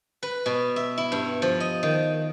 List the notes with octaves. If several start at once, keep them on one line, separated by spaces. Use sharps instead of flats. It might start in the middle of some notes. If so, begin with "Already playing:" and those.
B4
B2
E5
E4
G2
F3
D#5
D#3